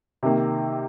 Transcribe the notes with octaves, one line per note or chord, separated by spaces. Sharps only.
C3 D#3 A#3